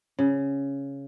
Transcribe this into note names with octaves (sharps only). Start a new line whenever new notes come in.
C#3